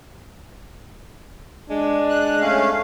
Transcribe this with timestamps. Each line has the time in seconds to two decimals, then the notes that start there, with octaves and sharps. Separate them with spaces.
1.70 G#3 D4
2.09 F#6
2.41 A3 C#4 F5